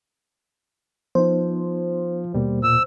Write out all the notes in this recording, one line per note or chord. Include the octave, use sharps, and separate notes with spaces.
F3 B3 D#4 C5
D#2 B2 G3 A#3
A#2 E6